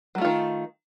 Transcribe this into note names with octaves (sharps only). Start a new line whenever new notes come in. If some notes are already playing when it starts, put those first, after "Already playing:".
D#3 F#3 A3 F4